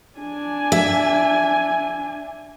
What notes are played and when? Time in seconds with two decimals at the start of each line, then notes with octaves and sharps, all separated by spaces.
0.19 D4 G#5
0.72 E5